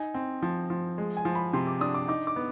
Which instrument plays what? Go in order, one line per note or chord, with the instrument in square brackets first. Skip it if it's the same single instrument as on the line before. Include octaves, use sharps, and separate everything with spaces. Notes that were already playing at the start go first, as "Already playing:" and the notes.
Already playing: [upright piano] D#4 G#5
C4
F3
F3
G#3
G#5
F3
B5
C3 C6
D6
D4 D#6
D6
D#4 D6
D6
B3